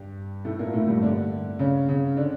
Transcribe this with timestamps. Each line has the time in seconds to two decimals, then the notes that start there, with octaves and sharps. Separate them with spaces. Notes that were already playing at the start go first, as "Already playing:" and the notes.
Already playing: G2 G3
0.45 A2 A3
0.59 A#2 A#3
0.73 A2 A3
0.87 G2 G3
1.02 D3 D4
1.59 C#3 C#4
1.88 C#3 C#4
2.17 D3 D4